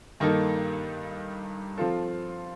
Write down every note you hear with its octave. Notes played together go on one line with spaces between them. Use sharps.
G2 D#3 A#3 D#4 A4
F3 C4 F4 A4